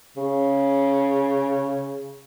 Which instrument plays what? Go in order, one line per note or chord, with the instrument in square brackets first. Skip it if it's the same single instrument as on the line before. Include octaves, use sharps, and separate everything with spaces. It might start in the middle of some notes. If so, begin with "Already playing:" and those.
[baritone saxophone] C#3